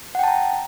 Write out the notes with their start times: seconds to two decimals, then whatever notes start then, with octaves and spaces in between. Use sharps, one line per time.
0.15 F#5
0.19 G5
0.24 A5
0.28 A#5